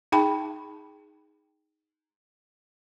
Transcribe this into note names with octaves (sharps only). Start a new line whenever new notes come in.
D#4 G#4 G5 A5 B5